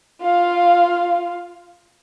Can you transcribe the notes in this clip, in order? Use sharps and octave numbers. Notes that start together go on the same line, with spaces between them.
F4 F5